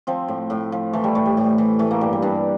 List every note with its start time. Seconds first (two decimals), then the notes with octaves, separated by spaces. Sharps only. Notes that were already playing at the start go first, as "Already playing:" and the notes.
0.07 F3 C4
0.28 A2
0.50 A2
0.72 F3
0.93 E3 A3
1.04 G3
1.15 A2 A3
1.26 G3
1.37 A2
1.58 E3
1.79 E3 A3
1.91 A#3
2.01 G2 G3
2.13 G3
2.22 G2 D4